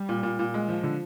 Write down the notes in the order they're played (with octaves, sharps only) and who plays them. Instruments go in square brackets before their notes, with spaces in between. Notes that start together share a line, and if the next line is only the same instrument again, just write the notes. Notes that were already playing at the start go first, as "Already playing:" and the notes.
Already playing: [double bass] G3
[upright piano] A#2
A#2
A#2
G#3
F3
D3